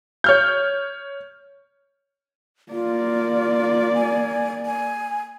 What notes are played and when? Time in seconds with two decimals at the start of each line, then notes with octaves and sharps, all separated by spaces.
0.24 C#5 F6 G6
2.72 A#3 F4 D5
3.94 G#5
4.66 G#5